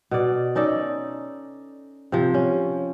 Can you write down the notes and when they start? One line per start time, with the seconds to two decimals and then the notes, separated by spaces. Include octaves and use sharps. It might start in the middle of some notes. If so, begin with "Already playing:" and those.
0.11 B2 D5
0.55 C#4 D#4 A4 D5
2.12 C3 F3
2.34 C#4